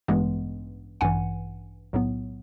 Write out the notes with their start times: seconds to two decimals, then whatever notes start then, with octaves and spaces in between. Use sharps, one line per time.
0.08 A1 G2 E3 G#3 B3
1.01 A1 G2 E3 F#5 G#5
1.93 B1 A2 F#3 B3